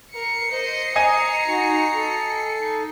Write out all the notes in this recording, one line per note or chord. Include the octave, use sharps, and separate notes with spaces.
A#4 C7 C#7
C5 D#5
D#5 G#5 A#5
D#4 F#4
A4
D#4